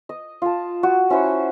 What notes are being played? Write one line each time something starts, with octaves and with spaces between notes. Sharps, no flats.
D#5
F4 A5
F#4
C#4 E4 C5 C#6